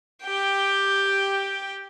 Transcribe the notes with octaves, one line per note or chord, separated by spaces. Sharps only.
G4 G5